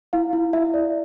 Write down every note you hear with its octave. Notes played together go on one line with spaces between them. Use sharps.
E4 F5
E4
E4 E5
D5